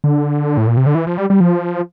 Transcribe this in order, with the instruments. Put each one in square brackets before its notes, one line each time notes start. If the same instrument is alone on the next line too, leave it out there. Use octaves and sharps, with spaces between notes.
[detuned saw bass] D3
A2
A#2
C3
D3
E3
F3
G3
G3
F3